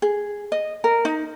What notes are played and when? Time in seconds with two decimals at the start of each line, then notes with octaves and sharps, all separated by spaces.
0.02 G#4
0.52 D#5
0.84 A#4
1.05 D#4